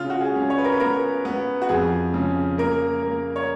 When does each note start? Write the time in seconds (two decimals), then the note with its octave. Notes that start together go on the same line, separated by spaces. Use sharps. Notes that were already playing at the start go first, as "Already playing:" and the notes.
Already playing: C#3 F4
0.10 F#4
0.20 G#4
0.36 C#4
0.50 C#5
0.58 B4
0.64 A#4
0.72 B4
0.80 B3 A#4
1.25 B3
1.62 F#4
1.69 F2 G#4
2.14 C#3
2.58 A#3 A#4
3.03 A#3
3.36 C#5